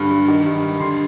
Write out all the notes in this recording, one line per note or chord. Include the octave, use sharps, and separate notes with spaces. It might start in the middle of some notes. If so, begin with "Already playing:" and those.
Already playing: G2 D3
G2
D#3
G2
G2
D3 C6